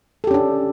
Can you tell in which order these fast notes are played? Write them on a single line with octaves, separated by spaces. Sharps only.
A4 G4 C#4 D4